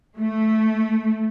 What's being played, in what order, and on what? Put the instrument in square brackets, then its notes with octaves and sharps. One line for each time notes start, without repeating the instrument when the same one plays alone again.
[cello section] A3